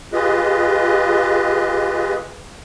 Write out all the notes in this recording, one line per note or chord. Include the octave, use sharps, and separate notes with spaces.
F4 G4 G#4 B4 D#5